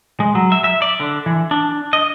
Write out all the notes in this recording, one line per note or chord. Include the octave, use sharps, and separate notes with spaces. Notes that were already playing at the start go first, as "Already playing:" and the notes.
G#3
F#3
E5
E5
D5
D3
E3
D4
D#5